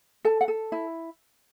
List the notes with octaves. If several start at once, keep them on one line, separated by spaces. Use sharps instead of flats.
A4 A5
F#5
A4
E4